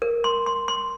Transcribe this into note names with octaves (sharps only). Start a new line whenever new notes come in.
A#4
C6
C6
C6